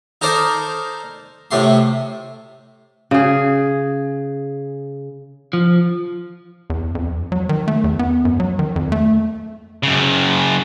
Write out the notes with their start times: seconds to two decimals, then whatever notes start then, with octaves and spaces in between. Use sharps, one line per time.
0.21 D#4 A4 A#4 C5 D5
1.51 A2 C3 A3 C6
3.11 C#3 G#4
5.53 F3
6.70 E2
6.95 F2
7.32 F#3
7.49 D#3
7.68 A3
7.84 E2
7.99 B3
8.25 F#2
8.40 F#3
8.59 D#3
8.76 F2
8.92 A3
9.83 F#2 C#3